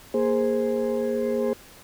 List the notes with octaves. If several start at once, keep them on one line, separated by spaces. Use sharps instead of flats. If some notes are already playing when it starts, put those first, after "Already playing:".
A#3 G#4 C5